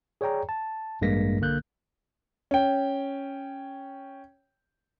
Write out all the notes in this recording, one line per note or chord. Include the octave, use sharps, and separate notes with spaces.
G#4 C#5 D5 G5 A#5
A5
A1 G2 G#3 A#3 A#6 B6
B1 D3 A#3 F#6 G6
C#4 G5